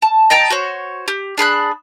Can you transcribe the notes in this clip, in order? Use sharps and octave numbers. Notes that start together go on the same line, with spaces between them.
A5
D#5 G5 A5 A#5
F#4 C5 C#5
G4
D4 G#4 B5 F#6